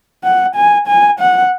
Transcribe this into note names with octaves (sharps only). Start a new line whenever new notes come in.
F#5
G#5
G#5
F#5